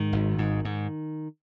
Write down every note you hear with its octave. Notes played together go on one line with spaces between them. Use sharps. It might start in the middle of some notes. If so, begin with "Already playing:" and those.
Already playing: G#2 D#3
G#1
G#2
G#2